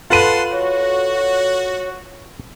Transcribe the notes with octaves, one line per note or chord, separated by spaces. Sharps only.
F4 A4 B4 F#5 A5 C6 D#7
F#4 C#5